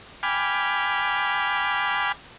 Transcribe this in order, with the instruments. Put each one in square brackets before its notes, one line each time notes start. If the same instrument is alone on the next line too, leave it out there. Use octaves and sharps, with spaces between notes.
[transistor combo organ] G5 G#5 B5 D6 F6